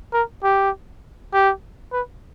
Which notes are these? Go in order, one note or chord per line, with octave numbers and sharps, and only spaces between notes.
A#4
G4
G4
B4